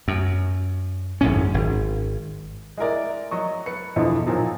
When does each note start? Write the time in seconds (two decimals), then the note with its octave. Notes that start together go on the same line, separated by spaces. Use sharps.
0.08 F#2
1.21 G#1 F#2 A2 C#4
1.54 G#1
2.78 G#3 E4 A#4 D5
3.31 F#3 D#5 C#6
3.66 B4 C#7
3.96 E2 B2 D3 E3 F3
4.27 A#2 D#3 F3 F#3